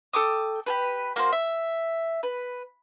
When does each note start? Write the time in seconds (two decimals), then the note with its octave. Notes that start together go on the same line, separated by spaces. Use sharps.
0.13 A4 G5 D6 D#6
0.66 G4 G#4 B4
1.16 A#3 F#4 A#4 C5
1.32 E5
2.23 B4